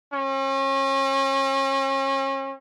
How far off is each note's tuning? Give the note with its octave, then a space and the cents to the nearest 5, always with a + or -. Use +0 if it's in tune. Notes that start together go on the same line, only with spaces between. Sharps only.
C#4 -35